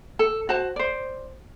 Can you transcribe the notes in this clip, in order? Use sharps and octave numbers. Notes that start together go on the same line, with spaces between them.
A4
F#4 C5 A5
C5 D5